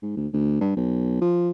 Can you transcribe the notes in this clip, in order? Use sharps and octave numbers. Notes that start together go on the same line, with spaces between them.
G#2
D2
D2
G2
B1
F3